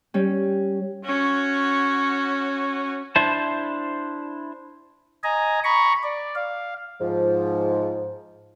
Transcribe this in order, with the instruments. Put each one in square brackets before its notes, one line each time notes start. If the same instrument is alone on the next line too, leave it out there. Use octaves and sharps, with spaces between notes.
[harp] G3 C#4
[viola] C#4 F#4
[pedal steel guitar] D4 E4 C5 A5
[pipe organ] D#5 G#5 A#5
A#5 B5 C#6
D5
F5
[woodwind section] G#2 F3